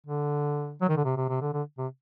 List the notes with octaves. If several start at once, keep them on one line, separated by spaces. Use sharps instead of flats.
D3
F#3
D#3
D3
C3
C3
C3
D3
D3
C3